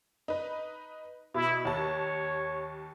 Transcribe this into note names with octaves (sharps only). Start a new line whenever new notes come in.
D#4 B4
B2 E4
D#2 C#5 A5